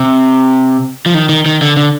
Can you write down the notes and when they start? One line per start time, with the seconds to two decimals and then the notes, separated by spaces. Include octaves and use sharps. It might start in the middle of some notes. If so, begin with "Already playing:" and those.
Already playing: C3
1.06 F3
1.14 D#3
1.29 D#3
1.46 D#3
1.62 D3
1.77 D3